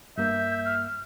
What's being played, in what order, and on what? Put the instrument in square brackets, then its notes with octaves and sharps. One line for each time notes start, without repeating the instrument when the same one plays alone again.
[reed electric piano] G2 A#3 [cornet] E5 [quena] G6
[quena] F6